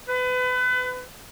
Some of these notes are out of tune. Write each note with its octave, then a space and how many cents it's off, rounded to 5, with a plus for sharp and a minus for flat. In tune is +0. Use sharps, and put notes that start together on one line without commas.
B4 +30